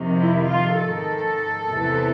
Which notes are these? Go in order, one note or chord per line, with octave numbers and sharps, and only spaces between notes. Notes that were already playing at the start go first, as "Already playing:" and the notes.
Already playing: F2 C3 D#3
E4
F4
D#3 A4
G#2
E2 C3 E3